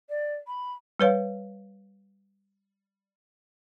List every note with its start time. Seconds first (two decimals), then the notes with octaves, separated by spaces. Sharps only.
0.10 D5
0.47 B5
1.00 G3 B4 C#5 F5